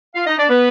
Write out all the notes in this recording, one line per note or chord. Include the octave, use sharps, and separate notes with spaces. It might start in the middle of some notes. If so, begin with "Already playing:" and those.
F4 F5
D#4 D#5
D4 D5
B3 B4